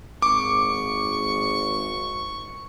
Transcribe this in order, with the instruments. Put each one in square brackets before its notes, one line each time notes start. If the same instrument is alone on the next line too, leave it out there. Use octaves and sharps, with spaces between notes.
[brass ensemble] G#1 [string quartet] C#6 [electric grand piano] D6